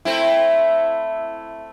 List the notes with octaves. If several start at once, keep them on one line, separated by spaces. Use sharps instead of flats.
A3 C4 E4